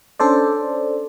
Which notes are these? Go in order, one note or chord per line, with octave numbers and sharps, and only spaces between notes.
C#4 D4 A4 C5 D5